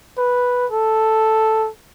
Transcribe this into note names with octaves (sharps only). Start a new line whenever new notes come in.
B4
A4